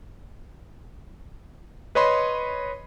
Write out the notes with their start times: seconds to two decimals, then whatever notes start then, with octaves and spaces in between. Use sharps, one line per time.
1.95 B4 C#5 D#5 B5 C6